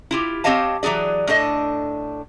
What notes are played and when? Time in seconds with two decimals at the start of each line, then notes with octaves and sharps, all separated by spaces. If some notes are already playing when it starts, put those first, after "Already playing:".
0.11 E4 F4 G4
0.44 C4 G4 C#5 D#5 F5 A5
0.83 E3 F#3 C#4 G#4 D5
1.27 A2 D4 A4 D#5